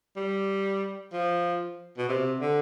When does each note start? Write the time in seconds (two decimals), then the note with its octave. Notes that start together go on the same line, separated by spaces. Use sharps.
0.17 G3
1.13 F3
1.98 B2
2.09 C3
2.40 D3